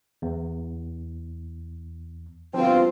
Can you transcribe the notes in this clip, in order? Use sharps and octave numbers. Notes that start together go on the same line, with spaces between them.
E2
G1 B2 F3 C4 F4